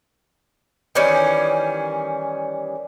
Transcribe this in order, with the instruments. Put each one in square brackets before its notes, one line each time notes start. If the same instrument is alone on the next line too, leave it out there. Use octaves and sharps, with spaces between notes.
[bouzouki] D#3 E3 G3 C#4